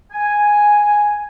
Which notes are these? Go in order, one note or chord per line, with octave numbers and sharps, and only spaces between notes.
G#5